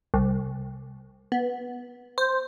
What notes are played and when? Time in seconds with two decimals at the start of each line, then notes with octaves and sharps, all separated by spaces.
0.14 C2
1.32 B3
2.18 C5